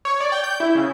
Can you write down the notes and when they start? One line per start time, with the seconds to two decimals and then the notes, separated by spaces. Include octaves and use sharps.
0.05 C#5
0.20 D5
0.32 G5
0.44 G6
0.60 E4
0.75 C#3